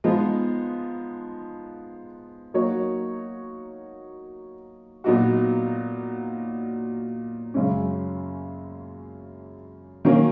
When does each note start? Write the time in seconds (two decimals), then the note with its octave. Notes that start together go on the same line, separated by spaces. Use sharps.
0.04 F3 G#3 B3 D#4
2.54 F#3 A#3 D#4 F#4 C#5
5.04 A#2 F#3 B3 D#4 F#4
7.54 F#2 C#3 G#3 C#4
10.05 D#3 F#3 A#3 C#4